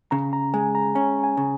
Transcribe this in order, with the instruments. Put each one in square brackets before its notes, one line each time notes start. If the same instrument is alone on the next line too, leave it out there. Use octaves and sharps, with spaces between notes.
[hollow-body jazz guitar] C#3 [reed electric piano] A#5
[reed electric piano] A#5
[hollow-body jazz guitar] G#3 [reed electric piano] G#5
[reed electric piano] A#5
[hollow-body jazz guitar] C#4 [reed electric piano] G#5
[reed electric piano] G#5
[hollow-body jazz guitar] C#3